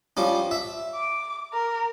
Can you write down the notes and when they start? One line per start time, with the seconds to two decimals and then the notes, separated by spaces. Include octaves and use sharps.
0.17 F3 G3 C#4
0.51 E5
0.96 D6
1.53 A#4